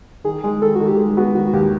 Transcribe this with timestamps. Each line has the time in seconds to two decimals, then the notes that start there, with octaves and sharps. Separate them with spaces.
0.24 D#3 G#4
0.43 G#3 G#4
0.62 D#3 A4
0.75 D#3 F#4
0.87 G4
0.98 G#3 G#4
1.17 B3 F#4
1.35 D#3 F#4
1.47 F#4
1.53 D#2 G4